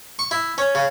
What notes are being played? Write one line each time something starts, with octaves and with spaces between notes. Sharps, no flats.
C#6
E4
C#4
C#3